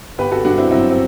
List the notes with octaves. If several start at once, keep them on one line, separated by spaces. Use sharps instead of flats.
G1 G4 B4
F#4 A4
G2 D4 F#4
C4 E4
F#3 C4 E4
C4